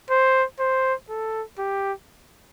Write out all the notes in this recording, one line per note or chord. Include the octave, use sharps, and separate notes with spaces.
C5
C5
A4
G4